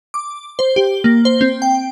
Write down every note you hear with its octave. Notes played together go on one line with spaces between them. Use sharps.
D6
C5
G4
A#3
C5
C4
G5